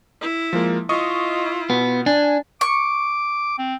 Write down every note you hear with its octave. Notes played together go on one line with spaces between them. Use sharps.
E4
F3 G#3 A#3
E4 F4 D#5 C#6 D#6
B2 B3
D4 G#5
C#6 D6
C4